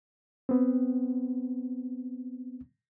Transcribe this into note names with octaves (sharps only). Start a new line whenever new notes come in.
B3 C4